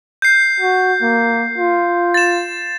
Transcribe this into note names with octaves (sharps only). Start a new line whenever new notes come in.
G6 C7
F#4
A#3
F4
A6 E7